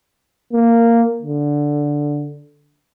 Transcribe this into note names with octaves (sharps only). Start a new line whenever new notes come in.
A#3
D3